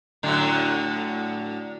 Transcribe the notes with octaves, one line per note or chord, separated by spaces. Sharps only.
A2 D3 F#3